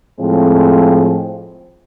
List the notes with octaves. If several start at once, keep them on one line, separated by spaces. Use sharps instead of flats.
A2 F3 G#3 C4